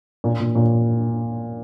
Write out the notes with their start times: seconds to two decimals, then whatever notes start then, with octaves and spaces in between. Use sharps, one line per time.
0.24 A#2
0.40 A#2
0.55 A#2